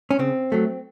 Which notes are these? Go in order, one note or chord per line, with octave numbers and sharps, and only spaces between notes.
C#4
C#3 C4
F#3 A3